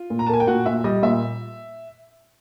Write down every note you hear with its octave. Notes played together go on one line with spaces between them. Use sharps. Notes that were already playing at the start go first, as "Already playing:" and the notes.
Already playing: F4
A#2
A#5
A5
A#3 G#5
G5
A#2 F#4 F#5
A#2 E5
G3 D#5
A#2 E5